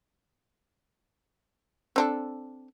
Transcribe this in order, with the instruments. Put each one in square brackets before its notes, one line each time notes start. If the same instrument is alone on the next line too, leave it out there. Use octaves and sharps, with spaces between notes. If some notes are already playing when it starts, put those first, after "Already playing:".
[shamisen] C4 D4 A4